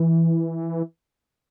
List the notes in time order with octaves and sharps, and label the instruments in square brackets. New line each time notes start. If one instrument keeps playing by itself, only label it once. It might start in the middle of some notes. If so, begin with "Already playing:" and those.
Already playing: [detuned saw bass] E3